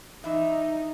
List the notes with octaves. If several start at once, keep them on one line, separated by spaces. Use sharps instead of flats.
E3 D#4 E5